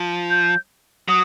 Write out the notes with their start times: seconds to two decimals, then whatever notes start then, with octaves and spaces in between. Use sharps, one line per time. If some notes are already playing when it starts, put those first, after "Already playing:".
Already playing: F3
0.30 G6
1.08 F#3 D#6